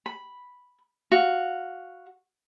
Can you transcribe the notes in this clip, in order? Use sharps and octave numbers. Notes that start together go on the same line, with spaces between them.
B5
F#4 F5